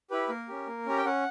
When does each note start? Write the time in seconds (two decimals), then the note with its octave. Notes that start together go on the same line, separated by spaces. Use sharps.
0.10 E4 G4 B4
0.29 A#3 A#4
0.48 C#4 G4
0.67 A#3
0.86 C#4 G4 A#5
0.97 G5
1.05 C#4 F#5